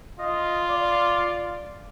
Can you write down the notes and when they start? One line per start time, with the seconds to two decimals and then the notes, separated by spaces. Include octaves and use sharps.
0.19 F4 D#5
0.69 D5